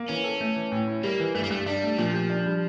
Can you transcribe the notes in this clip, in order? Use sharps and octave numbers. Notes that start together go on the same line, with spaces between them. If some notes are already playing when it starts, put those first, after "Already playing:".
Already playing: A#3
E3 C#4
A4
A3
E3
A2
E4
G3 A#3
E3
G2 A3
A#3
G2 A3
G3 D4
A3
A#2 F3
G4
D4
G3